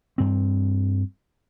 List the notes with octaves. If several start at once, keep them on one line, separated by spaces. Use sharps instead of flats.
G2 C4